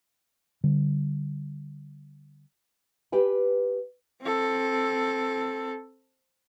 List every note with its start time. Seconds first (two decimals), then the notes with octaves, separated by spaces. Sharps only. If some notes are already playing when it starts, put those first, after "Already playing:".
0.64 D3 G3
3.12 G4 B4 G5 G#5
4.22 C4 A4